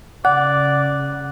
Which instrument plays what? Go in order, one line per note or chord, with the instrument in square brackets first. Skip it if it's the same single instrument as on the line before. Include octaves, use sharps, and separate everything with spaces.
[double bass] C#3 [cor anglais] D5 [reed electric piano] F#5 [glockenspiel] F#6